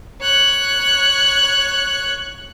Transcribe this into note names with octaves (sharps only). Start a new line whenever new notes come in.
C#5 F#6